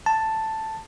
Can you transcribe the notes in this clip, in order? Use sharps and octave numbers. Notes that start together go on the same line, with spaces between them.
A5